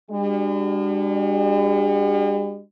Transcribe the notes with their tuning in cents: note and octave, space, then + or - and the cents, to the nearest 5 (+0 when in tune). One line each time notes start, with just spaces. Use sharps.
G#3 -45 D4 +10 F#4 +40